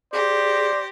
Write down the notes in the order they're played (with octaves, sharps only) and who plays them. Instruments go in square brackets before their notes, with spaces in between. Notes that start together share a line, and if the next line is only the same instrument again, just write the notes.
[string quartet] G4 A#6 [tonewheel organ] G#4 [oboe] C5 [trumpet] D5